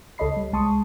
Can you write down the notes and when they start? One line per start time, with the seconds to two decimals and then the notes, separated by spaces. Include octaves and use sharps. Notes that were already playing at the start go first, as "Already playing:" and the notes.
0.18 C#2 A4 C#5 D#5 B5 C7
0.37 G3
0.53 C2 G#3 A5 C6 C#6 D#6